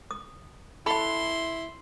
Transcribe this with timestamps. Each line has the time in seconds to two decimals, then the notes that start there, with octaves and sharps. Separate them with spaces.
0.11 D#6
0.86 E4 A4 F#5 B5 C6